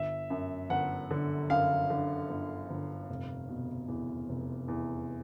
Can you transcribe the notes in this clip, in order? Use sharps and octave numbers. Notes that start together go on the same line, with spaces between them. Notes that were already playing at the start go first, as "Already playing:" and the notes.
Already playing: G1 E5
F#2
G1 F#5
D3
F#2 F5
D3
G1
G1
F1
B2
E2
F1
E2